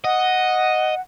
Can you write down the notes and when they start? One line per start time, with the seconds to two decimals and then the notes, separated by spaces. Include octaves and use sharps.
0.04 D#5 F#5